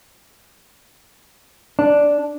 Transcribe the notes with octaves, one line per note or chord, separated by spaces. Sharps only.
D4